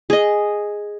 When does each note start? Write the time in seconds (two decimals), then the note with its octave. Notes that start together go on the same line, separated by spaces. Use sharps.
0.10 G#4 D#5